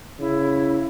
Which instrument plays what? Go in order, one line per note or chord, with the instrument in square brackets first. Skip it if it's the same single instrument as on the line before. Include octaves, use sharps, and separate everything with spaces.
[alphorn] C#3 [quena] E4